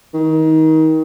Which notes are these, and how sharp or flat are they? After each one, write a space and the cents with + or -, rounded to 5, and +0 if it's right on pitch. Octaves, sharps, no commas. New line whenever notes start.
D#3 +25